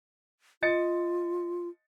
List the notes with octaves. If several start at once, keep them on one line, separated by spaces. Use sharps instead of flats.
F4 D#5 A6 C#7